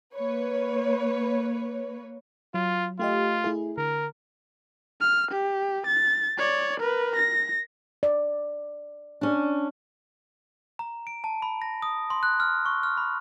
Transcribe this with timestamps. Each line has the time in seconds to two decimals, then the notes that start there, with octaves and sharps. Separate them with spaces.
0.15 A#3 B4 C#5
2.54 F#3 F4
2.99 A3 F4 G4 D#5
3.44 A3 E4 G#4
3.77 D3 A#4
5.00 F6
5.31 G4
5.86 A6
6.38 C#5 D5
6.80 A#4 B4
7.16 A#6
8.03 D5
9.21 C#4 D4
10.79 A#5
11.07 D7
11.24 A5
11.42 B5
11.62 A#6
11.82 D#6
12.10 C6
12.23 F#6
12.40 F6
12.66 C#6
12.83 F6
12.97 B5